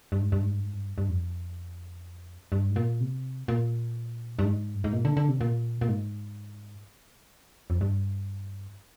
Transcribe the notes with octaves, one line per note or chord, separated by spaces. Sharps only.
G2
G#2
G2
G#2
G2
G#2
G2
G2
F2
G2
G#2
A#2
C3
A#2
G2
G#2
G2
G#2
A#2
D3
D3
C3
A#2
A#2
G#2
F2
G2